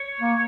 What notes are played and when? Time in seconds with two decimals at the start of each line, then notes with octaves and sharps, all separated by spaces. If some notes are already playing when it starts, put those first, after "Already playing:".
Already playing: C#5
0.20 A#3